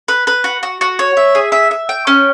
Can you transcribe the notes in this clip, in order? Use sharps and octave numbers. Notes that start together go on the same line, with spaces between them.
B4
B4
F#4
F#4
F#4
C#5
E5
G#4
E5
E5
G5
C#4